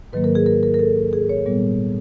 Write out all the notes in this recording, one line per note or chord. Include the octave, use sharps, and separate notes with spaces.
G#2 D#3 F#3 A#3 B4
A#4
G#4
A#4
A#4
A#4
A4
G#4
C#5
A#2 G3 B3